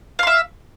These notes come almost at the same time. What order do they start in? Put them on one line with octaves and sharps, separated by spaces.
F5 C6 E5